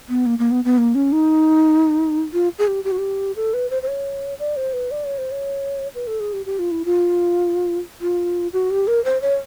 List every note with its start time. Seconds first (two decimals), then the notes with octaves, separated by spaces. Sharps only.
0.09 B3
0.26 A#3
0.39 A#3
0.51 B3
0.65 B3
0.78 A#3
0.95 C#4
1.12 D#4
2.33 F4
2.59 G#4
2.68 G4
2.84 G4
2.92 F#4
2.98 G4
3.36 A4
3.54 B4
3.70 C5
3.83 C5
3.88 C#5
4.39 D5
4.57 C5
4.73 B4
4.91 D5
5.05 C#5
5.18 C5
5.31 C#5
5.95 B4
6.07 A4
6.20 G#4
6.33 G4
6.46 G4
6.59 F4
6.71 E4
6.85 F4
8.01 F4
8.53 F#4
8.71 G4
8.87 A#4
9.05 C5
9.22 C#5